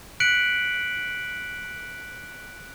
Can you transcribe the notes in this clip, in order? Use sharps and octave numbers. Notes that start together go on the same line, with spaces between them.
F#6 B6 C#7 D7 F#7